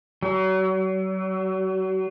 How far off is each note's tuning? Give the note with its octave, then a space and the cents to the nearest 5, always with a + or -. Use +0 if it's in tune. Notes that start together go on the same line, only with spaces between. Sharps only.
F#3 +35